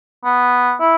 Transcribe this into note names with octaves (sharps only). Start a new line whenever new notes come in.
B3
E4